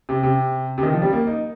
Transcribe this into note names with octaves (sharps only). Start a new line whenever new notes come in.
C3
C3
C3
D#3
F3
G3
A#3
D#4